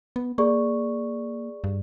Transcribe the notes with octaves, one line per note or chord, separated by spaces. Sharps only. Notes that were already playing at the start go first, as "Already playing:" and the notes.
B3
A#3 G#4 D5 C#6
G2